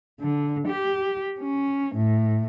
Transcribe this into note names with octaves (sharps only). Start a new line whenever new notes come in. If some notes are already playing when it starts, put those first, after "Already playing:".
D3
G4
C#4
A2